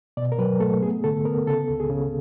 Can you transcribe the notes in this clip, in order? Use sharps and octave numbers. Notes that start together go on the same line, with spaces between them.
B2 D5
A#4
F#3 B4
A3 A4
B3 G#4
D3 A4
B3 A#4
C#3 A4
C#2
G#4
C#3